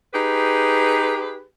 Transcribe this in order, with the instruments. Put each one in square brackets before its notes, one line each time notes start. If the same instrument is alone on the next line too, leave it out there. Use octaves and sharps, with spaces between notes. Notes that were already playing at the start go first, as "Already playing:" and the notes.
[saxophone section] D#4 G4 G#4 B4